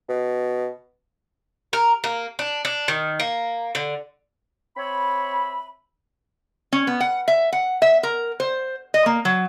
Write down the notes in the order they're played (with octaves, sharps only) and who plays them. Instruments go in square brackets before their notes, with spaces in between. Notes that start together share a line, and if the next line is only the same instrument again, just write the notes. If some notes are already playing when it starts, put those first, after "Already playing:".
[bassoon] B2
[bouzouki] A#4
A#3
D4
D4
D#3
A#3
D3
[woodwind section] C4 C#5 E5 B5
[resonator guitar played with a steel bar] C#4
B3
F#5
E5
F#5
E5
A#4
C5
D#5
A#3
F#3